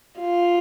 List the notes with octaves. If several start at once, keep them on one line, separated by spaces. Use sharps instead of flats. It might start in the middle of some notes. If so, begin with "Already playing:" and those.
F4